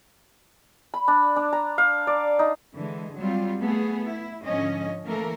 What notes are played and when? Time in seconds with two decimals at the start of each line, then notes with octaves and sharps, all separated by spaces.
0.94 B5
1.08 D4
1.36 D4
1.53 A#5
1.78 F5
2.07 D5
2.39 D#4
2.76 D3 E3 G#3
3.17 F#3 G3 C4 F4
3.60 A3 B3 G#4
4.06 E4
4.43 G#2 D3 F3 C#4 D#5
5.06 E3 A3 A#3 A4 A#4